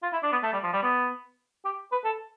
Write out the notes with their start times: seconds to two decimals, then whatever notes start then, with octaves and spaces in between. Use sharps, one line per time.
0.03 F4
0.13 E4
0.23 D4
0.32 B3
0.43 A3
0.53 G3
0.63 F3
0.73 G3
0.83 B3
1.65 G4
1.92 B4
2.05 A4